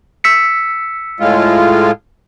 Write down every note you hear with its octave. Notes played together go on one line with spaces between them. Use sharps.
E6 B6 C#7
A2 G#3 F4